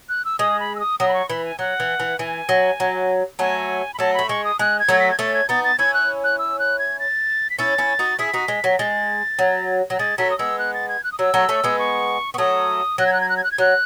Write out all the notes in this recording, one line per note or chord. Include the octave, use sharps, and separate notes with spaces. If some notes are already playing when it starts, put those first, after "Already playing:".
F#6
E6
G#3 D#6
B5
E6
D#6
F#3 D#6
B5
C#6
E3 B5
G#5
F#3 F#5
E3
E3
E3 G#5
F#3
F#3
F#3 A3 G#5
B5
F#3 A3 A5
A3 B5
G#3 C#6
D#6
G#3 F#6
G#6
F#3 A3
B6
G#6
A3 C#4 A6
G#6
B3 D#4 A6
A6
C#4 E4 G#6
F#6
F#6
E6
F#6
G#6
A6
B6
C#4 E4 A6
C#4 E4
D#4 F#4
E4 G#4 B6
D#4 F#4
G#3
F#3
G#3 A6
F#3
F#3
G#3 A6
F#3 A3 B6
D#6
G#3 B3 E6
F#6
A6
G#6
F#6
D#6
F#3 E6
F#3 A3
A3 C#4
G#3 B3
C#6
B3 C#6
F#3 A3 D#6
F#3 F#6
G#6
F#6
G#6
F#6
G#6
F#6
G#6
F#3 F#6